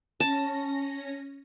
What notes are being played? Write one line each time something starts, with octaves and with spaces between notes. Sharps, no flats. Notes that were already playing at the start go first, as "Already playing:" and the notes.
C#4 A5 A#6